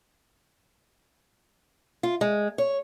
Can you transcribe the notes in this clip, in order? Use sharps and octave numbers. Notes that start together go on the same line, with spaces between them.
F4
G#3
C#5